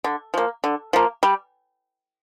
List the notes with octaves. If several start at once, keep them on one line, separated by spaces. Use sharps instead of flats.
D3
F3 A#3
D3
F3 A#3
G3